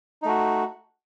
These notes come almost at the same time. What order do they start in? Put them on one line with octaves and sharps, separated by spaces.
D#4 A3 F#4